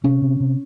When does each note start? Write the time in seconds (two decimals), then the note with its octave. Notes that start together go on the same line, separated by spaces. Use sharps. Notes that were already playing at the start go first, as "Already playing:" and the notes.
0.04 C3 C#4
0.22 C3
0.40 C3